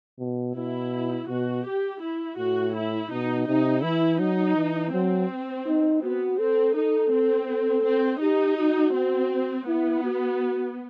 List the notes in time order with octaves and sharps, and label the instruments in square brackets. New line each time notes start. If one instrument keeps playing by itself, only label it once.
[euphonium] B2
[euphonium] B2 [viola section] E4
[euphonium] B2 [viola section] F#4
[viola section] G4
E4
[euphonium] A2 [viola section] F#4
[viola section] E4
[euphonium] B2 [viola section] D#4
[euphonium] C3 [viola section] D#4
[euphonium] E3 [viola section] E4
[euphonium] F#3 [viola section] D#4
[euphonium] E3
[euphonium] F#3 [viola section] C4
[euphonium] D#4
[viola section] B3 [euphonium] F#4
[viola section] C4 [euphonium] A4
[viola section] D#4 [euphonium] A4
[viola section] C4
[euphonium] A4
[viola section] C4
[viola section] D#4 [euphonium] G4
[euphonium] F#4
[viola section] C4
[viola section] B3 [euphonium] E4
[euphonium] F#4